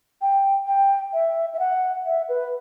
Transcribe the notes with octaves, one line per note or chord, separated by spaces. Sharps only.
G5
G5
E5
E5
F#5
E5
B4